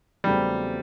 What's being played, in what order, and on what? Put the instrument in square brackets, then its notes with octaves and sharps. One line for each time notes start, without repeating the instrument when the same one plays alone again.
[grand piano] E2 C#3 F#3 A3 C4 [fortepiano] G3